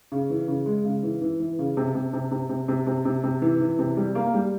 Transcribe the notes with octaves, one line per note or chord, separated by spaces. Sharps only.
C#3
E3
C#3
G#3
C#3
E3
E3
E3
C#3
C3
C3
C3
C3
C3
C3
C3
C3
C3
E3
E3
C3
G3
A#3
G3